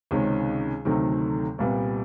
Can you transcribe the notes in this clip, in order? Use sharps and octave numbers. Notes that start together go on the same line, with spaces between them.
C#2 C3 D#3 G#3 C#4
D2 C3 D#3 F#3 A3
C2 A#2 G3 B3